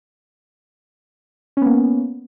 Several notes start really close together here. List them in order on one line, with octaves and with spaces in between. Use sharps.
C#4 B3 A#3